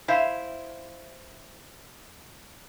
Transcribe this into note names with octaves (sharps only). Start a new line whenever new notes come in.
E4 C5 E5 F5